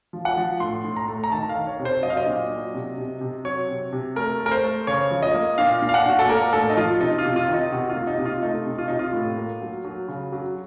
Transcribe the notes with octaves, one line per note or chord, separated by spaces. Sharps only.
F3
F#5
F3
A2 C6
A2
A#5
A3
A#5
D#3 A5
F5
D#3
C#5
C3
C5
F#3 D#5
F5
D#5
A#2
F#3
C3
C3
C3
F#3 C#5
C3
C3
A3 A#4
A3
A#4
C5
A3
C#3 C#5
F3
D#5
A#3
A#2 F5
A#2
F5
F#5
A#2 F#4
A4
A#3 A#4
A2 A4
D#4
F3 F4
C3 D#4
F4
C3
F4
D#3
D#4
C3 F#4
F4
A#3
D#4
C3
F4
A3 D#4
C3
F4
C3 D#4
F4
A2
A#3
F#3
F#3
C#3
F#3